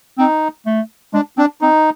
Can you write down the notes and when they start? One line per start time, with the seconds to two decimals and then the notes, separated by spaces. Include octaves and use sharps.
0.18 C4 D#4
0.67 A3
1.14 G#3 D4
1.37 C4 D4
1.61 C4 D#4